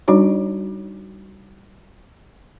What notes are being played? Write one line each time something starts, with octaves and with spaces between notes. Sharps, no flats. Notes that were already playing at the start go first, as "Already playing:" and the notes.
G3 D4 D#4 F#4 C#5